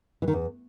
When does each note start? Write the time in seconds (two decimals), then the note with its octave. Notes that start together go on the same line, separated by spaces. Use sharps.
0.22 E3
0.28 D#3
0.33 E2